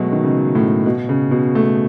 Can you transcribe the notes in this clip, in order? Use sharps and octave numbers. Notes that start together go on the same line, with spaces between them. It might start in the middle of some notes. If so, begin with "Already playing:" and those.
Already playing: B2 F#3 G#3 A3
D#3
C#3
A2
B2
C#3
B2
A3